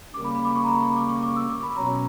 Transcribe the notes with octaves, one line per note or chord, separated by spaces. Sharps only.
C#3 G3 A#3 D6
B5
B5
D6
C#6
A#5
B5
C#6
D6
C#6
D6
E6
D6
B5
B2 F#3 C#4 A#5